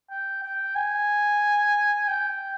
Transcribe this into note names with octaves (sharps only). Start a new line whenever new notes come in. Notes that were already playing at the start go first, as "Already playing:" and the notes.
G5
G5
G#5
G5